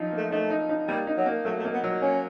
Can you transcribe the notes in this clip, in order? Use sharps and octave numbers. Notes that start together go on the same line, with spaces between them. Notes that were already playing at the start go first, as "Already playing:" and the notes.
Already playing: F3 F#3 D#4
A3 A#3
A3 D#4
D#4
D#4
G3 A#3
D#4
F#3
A#3
F#3 A3
A3
A#3
B3
F#3
A#3 C#4